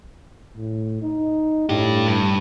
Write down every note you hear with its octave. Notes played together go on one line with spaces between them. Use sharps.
A2
D#4
A2 D4 G4
G2